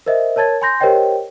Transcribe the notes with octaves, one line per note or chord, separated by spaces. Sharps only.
A#4 C5 D#5 E5
A#4 C#5 A5 G#6 A6
G#5 B5 C6 G6 A#6
G4 A#4 C5 C#5 D#5 G5